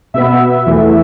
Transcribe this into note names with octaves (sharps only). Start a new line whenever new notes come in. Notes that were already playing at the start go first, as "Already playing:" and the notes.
B2 B3 E5
E2 E3 A3